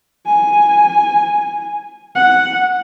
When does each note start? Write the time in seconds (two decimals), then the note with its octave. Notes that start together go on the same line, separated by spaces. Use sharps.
0.26 G#5
2.16 F#5